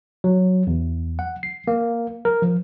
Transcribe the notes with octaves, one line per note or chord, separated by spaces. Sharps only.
F#3
E2
F#5
C7
A#3
A#4
F3